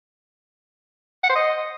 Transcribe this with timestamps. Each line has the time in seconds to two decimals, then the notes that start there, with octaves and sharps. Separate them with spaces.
1.24 F#5
1.29 C5
1.35 D#5